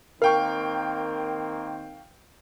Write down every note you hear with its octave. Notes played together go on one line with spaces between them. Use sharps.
D#3 A#3 C4 A#4 F5 G5 C#6